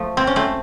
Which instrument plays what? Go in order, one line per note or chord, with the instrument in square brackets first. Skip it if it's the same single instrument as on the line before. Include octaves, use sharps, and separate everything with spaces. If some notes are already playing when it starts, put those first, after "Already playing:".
Already playing: [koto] F3 A3
C4
C#4
A3 C4